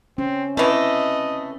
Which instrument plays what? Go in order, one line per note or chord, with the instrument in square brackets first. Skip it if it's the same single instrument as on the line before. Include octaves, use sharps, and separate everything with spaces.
[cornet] C4 [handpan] C#4
[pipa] E3 A3 [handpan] C4 [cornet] D#5